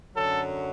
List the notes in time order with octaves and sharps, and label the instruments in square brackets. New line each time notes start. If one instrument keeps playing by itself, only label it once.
[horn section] F#2 D3 F#3 A4